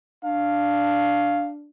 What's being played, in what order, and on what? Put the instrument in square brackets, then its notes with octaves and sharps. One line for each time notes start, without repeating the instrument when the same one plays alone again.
[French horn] D4 [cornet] F5